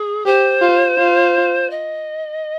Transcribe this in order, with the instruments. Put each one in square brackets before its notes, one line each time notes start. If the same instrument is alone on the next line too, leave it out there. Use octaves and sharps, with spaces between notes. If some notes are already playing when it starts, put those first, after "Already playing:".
Already playing: [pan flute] G#4
[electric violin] G4 [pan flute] C5
[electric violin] F4
F4
[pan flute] D#5